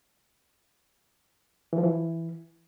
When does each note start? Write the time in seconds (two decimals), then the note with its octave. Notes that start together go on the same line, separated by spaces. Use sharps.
1.73 E3
1.78 F3
1.83 E3